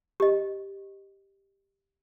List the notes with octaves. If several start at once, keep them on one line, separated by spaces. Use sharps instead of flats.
G4 D#5